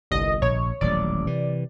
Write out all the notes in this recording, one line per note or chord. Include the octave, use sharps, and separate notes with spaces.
G1 C2 D#5
A#1 C#5
D#1 A1 F#3 D5
C3 E3